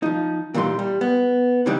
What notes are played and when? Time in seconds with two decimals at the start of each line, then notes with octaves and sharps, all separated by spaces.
0.03 F3 D#4
0.54 A#2 E3 G3 D#4 C6
0.79 G3
1.01 B3
1.66 C#3 E3 G3 C4 D4 D#4